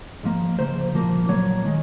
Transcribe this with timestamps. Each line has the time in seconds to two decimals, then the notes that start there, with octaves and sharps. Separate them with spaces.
0.23 G#2 F3 A#3
0.58 C#2 C#3 F3 A#3 C5
0.94 C2 A#2 F3 A#3
1.29 A#2 F#3 A#3 C#5
1.65 D#3 G#3